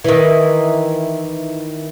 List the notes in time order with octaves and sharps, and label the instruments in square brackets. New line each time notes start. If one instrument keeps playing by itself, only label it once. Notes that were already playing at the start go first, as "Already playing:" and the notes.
[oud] D#3 E3